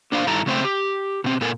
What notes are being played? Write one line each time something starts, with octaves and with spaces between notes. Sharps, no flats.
A#3 D4 C5 F5
G2 D#3 E4 A4 A#5
C#3 A3 C4 C5 E5 G5
G4
B2 C4
A#2 B3 A4 A#4 G#5